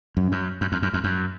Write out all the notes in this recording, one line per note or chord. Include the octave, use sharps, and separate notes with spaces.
F#2
F#2
F#2
F2
F#2
F2
F#2